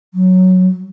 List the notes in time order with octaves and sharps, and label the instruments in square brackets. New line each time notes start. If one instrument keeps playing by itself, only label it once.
[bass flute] F#3